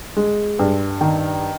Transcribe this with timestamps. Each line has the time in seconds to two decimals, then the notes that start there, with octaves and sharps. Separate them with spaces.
0.17 G#3
0.59 G2
1.01 D#3